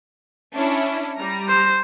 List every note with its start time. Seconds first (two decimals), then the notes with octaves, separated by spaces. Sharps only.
0.55 C#4 D4 E4
1.17 G3 A#5
1.49 C5